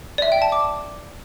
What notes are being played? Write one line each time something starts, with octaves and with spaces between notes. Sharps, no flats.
D5
E5
G5
A5
D6